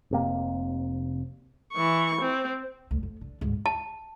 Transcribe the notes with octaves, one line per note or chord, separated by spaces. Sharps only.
F1 C3 A#3
E3 C#6
C4
D2
F2
D3
D2 G#2
A5